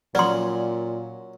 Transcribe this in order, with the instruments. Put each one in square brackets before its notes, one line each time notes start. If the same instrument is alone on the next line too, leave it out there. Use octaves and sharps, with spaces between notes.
[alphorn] A#2 [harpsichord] F#3 C#4 [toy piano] D5 C6